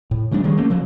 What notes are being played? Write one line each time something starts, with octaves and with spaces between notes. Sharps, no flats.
A2
C#3 F#3 G#3 D4
D#3 G3 G#3
A3 A#3 C#4
C#3 F3 F#3